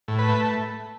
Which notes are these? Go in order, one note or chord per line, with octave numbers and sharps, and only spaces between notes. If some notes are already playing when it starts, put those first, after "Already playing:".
A2
B4
A3